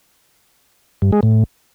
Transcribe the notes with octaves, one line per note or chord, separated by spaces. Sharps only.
G2
G#3
A2